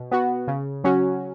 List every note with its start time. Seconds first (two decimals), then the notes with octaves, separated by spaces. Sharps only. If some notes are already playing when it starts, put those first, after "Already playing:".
Already playing: B2
0.11 B3 F#4
0.48 C#3
0.84 F#3 C#4 F#4